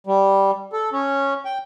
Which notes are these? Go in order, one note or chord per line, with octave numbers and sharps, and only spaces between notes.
G3
A4
C#4
G5